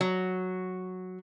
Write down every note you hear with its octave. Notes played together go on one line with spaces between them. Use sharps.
F#3